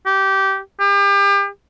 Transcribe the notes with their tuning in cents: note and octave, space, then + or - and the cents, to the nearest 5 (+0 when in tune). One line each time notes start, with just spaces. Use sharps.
G4 -15
G4 +35